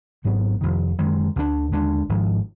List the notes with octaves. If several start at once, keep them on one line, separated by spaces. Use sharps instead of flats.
G#1 G#2 F#3 B3
F1 F2 D#3
F#2 D#3 G#3
D2 D3 F#3 D4
D#2 D3 G#3 D4
G#1 G#2 F3